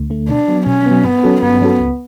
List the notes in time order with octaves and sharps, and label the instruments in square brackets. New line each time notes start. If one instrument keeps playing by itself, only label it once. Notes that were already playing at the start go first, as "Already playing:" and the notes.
Already playing: [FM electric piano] D2 D3 A3
D3 A3
[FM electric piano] B2 [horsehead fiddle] D4
[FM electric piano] F#3 B3
[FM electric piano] B2 [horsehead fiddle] C#4
[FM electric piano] F#3 B3
[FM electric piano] G2 [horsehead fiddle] B3
[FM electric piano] F#3 C#4 F#4 A4
[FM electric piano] G2 [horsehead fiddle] B3
[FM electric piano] F#3 C#4 F#4 A4
C#2